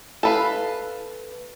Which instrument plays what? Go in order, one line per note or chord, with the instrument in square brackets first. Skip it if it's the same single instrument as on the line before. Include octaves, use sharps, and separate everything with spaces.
[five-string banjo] A4 B4 F5